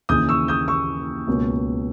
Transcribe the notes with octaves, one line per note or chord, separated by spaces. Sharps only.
D#2 C#3 E3 D#6 G6
C#6 E6
D#6 G6
C#6 E6
C#2 B2 A#3 C#4